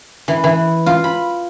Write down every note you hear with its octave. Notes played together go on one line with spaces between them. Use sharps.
E3
E3
F4
B5